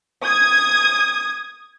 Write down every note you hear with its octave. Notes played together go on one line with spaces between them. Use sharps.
D#6 G#6